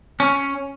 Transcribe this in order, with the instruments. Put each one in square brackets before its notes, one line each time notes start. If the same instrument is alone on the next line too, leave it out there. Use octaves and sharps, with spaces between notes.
[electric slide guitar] C#4